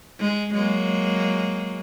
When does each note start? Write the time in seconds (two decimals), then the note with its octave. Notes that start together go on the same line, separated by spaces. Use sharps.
0.20 G#3
0.54 F#3 G#3 A#3